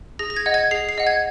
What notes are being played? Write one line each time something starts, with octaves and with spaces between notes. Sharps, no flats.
G#4 A#6
A#6
G#6
D#5 F#5
G#6
G#4 C7
C7
D#5 F#5
G#6